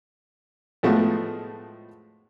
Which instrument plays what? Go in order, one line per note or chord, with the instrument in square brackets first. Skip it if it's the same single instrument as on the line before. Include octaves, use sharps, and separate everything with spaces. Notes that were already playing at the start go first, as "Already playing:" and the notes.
[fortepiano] A2 F3 G#3 A3 B3 F#4